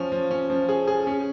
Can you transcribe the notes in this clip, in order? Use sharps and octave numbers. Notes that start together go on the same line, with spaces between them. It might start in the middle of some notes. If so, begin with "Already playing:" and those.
Already playing: F3 C#4
F3
C#4
F3
G#4
G#4
C#4